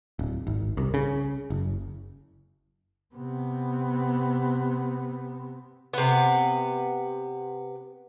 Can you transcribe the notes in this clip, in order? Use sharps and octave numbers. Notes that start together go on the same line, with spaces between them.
D1
G#1
C2
C#3
F#1
C3 B3
C3 B3